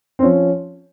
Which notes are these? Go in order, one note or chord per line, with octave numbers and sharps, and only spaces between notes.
C4
F3 C#4